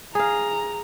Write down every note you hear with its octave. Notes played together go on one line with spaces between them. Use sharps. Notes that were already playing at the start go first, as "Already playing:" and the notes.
G#4 F5 A#5